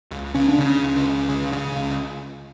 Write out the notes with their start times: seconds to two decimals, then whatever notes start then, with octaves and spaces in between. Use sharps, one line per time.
0.11 C#2
0.34 C#3 C#4
0.48 D4
0.59 C#3 C#4
0.83 C#2
1.05 C#2
1.29 C#3
1.52 C#3
1.76 C#2